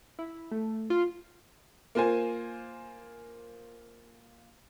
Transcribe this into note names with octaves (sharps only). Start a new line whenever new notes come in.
E4
A3
F4
A#3 F4 C5 G#5